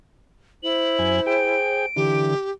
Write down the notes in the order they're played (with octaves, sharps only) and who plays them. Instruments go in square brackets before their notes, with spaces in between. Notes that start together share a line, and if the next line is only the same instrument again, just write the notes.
[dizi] E4 [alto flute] C5 [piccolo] F#7
[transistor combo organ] F#2 G#5
[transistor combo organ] G#4 G5 [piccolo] D7
[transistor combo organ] D3 E3 [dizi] G4